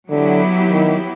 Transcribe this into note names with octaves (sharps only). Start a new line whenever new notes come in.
D3 F#3 B3 E4 G4
D#3